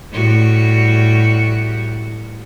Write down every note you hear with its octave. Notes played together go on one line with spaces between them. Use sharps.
A2 G3 F#4